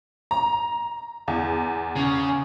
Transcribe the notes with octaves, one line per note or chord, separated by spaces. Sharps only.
A#5
E2
C#3